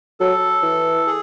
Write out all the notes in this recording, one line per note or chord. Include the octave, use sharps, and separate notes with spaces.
F#3 A4
E3
G#4